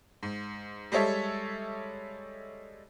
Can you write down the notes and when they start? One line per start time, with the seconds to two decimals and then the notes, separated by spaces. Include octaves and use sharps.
0.23 G#2
0.92 G3 G#3 A4 C#5 E5